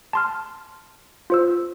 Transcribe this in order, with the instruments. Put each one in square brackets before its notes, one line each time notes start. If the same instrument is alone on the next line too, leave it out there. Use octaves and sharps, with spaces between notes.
[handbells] A5 C6 F6
F4 C5 E6